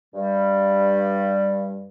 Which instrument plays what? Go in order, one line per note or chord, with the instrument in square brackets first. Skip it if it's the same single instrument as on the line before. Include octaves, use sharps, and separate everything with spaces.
[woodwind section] G2 G3